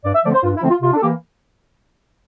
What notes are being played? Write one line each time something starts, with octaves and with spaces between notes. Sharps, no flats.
G2 D5
E5
D3 F3 A3 C4 D5
C5
G2 F4
E4
D3 F3 A3 C4
F4
C3 F4
D4
A4
E3 A#3 G4